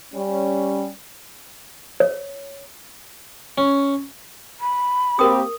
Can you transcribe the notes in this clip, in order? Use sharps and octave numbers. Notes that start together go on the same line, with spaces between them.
G3 C#4
C#5
C#4
B5
A#3 C4 G4 A#4 D#6